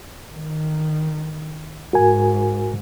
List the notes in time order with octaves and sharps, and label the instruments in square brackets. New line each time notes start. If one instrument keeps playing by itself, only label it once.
[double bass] D#3
[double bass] G#2 [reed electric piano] F#4 A#4 G#5